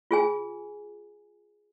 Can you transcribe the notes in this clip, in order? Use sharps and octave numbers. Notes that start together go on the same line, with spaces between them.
F4 G#4 G#5